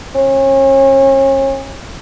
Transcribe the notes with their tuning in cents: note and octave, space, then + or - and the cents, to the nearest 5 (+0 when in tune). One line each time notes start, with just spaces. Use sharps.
C#4 -35